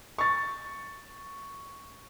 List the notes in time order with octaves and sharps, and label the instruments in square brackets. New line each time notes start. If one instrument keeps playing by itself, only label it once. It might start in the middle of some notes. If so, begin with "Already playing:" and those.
[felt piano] C#6 A6